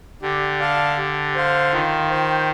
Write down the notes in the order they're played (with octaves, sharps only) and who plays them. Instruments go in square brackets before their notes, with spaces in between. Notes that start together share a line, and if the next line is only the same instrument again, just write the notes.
[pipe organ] D3 [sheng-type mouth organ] G4
[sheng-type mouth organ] D5 F5 A5
G4
C5 F5
[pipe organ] D#3 [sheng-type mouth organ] F4
[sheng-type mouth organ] C5 G5